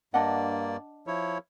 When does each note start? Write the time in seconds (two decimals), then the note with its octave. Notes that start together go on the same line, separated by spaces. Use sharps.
0.14 G2 A#3 D4 D5 D#5 F#5
1.07 F3 E4 C#5